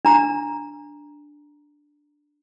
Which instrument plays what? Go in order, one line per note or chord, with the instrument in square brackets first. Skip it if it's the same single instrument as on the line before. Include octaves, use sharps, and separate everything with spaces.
[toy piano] D4 A#5